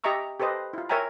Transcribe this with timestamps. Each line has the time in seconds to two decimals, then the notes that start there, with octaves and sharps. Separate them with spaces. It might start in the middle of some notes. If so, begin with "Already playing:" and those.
0.04 G4 D#5 E5 A#5 C#6 E6
0.40 G4 A4 B4 C5 D#5
0.73 E4 F4
0.89 A#4 C#5 E5 G5 G#5 A#5